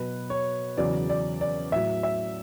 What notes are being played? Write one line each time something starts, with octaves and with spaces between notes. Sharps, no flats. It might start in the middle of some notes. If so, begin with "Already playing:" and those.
Already playing: B2 F#3 B4
C#5
E2 C#3 F#3 D5
D5
D5
A2 F#3 E5
E5